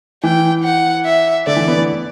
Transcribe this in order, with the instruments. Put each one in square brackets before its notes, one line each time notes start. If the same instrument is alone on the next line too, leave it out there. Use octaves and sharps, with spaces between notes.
[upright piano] E3 [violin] G5
[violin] F#5
E5
[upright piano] D3 [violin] D5
[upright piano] E3
B3
B3